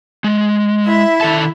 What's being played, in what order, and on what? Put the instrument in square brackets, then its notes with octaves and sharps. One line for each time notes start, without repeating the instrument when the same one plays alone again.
[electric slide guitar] G#3
[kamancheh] E4 E5
[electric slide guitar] D#3 A4 A5